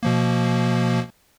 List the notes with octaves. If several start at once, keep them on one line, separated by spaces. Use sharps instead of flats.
B2 F3 A#3